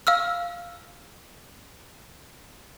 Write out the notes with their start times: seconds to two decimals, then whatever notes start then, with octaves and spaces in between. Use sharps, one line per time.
0.07 F5 E6 F6